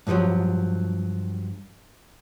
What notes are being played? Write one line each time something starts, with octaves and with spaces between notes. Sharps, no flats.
G2 B2 D#3 F3 F#3